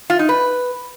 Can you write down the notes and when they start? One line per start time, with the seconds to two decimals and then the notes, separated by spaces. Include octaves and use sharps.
0.10 F4
0.19 D#4
0.29 B4